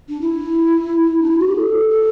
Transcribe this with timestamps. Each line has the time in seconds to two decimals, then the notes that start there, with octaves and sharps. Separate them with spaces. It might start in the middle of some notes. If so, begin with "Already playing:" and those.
0.08 D4
0.20 E4
1.22 D4
1.30 E4
1.39 F#4
1.47 G4
1.55 A4
1.89 A4